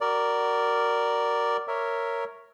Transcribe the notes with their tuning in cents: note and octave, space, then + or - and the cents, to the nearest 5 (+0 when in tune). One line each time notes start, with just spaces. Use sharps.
F#4 +25 A#4 +0 D5 +0
A#4 -5 C#5 +0 E5 +0